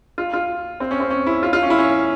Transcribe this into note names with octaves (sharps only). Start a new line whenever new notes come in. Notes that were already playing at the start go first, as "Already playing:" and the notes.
F4
F4
C4
C#4
C4
C#4
E4
F4
F4
C#4
E4
C#4